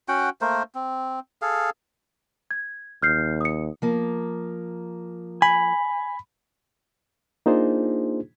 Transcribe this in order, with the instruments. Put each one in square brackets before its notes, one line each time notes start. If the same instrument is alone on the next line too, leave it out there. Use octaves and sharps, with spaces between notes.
[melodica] C#4 F#4 F#5 G5
A3 A#3 A#4 C5
C4
G#4 A4 F5
[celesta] G#6
[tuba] D#2 [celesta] F6 G6 C7
[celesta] D#6 C#7
[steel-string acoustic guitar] F3 A#3
[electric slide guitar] G#5 [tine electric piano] B5
[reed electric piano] A#3 D4 D#4 F4 G#4 C5